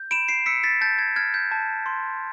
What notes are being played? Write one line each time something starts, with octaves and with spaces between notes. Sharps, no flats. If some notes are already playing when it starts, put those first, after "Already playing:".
Already playing: G6
B5 D7 E7
C7 D7
E6 B6 C#7
A6 B6
A5 G6 A6
G#6
F6 G#6
G6
A5
C6